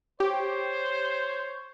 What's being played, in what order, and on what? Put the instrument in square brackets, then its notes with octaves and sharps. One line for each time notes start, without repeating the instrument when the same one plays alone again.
[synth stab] G4 [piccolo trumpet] C5 [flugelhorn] C#5